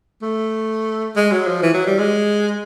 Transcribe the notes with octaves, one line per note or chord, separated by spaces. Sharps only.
A3
G#3
F#3
F3
E3
F#3
G3
G#3